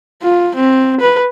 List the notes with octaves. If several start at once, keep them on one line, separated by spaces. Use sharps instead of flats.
F4
C4
B4